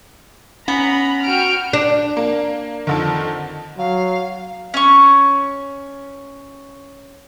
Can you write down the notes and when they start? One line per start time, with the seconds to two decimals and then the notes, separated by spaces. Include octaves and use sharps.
0.68 B3 C#4 A#5 B5
1.25 F#4 G5 F6 D7
1.73 D4
2.17 A#3
2.87 F2 D3 D#3
3.78 F#3 F5
4.74 C#4 C#6